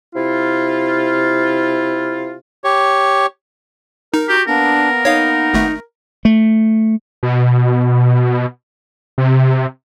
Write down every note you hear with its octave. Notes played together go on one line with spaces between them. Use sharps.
C3 E4 F4
G4 C#5
D#4 A#4
F#4 G4
A#3 B3 D4 A#4
D#4 C#5 F5
G#1 A3
A3
B2
C3